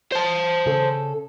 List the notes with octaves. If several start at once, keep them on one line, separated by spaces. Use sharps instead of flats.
C5 A5
C#3 A4